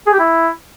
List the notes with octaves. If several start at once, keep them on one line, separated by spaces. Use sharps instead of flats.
G#4
G4
E4